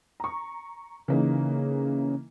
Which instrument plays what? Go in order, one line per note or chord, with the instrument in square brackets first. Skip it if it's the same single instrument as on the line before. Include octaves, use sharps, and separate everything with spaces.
[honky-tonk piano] A#5 C#6
[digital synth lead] C#3 [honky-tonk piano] E3 A#3 D#4